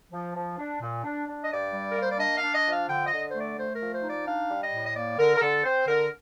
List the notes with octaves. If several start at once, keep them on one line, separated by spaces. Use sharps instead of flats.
F3
F3
D4
A#2
D4
D4
D#5
G2 D5
G3
A#4
A#3
C5
D5
D4 D#5
F5
D4
D#5
F3
F5
D3 G5
D#5
D3
C5
A3
D5
A3 C5
A#4
F3
C5
D#4
D5
D4 F5
G3
D#5
A2
D#5
A#3 D5
D3 A#4
A#4
D3 A4
C4 C5
D3 A#4